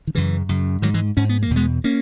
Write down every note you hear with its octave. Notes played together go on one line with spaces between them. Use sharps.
D#3
F#2 C#3 E3
F#2 C#3
G#2 D#3 F#3
E3 G#3
G#2 C#4
B3
A#3
E2 B2
G#3 B3
A#3 C#4